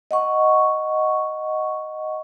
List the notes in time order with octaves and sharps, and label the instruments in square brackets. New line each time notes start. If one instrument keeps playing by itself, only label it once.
[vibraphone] D#5 F#5 C#6